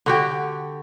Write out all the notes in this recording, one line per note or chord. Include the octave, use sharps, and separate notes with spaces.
D3 F#4 G4